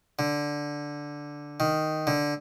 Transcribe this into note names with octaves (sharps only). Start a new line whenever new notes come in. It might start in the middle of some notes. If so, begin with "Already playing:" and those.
D3
D#3
D3